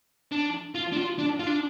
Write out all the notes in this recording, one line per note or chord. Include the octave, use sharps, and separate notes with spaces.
D4
F4
D4
F4
D4
F4
D4